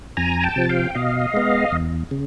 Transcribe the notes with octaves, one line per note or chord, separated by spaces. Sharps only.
F2 G#5 A#5
G5 A5
C3 F3
F5 G5
B2 D#5 F5
G#3 B3
E2
C#3